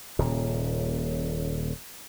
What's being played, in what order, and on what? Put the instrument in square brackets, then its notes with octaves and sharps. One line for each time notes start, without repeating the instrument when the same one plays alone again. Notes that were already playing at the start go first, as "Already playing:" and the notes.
[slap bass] D#1 A#2 C#3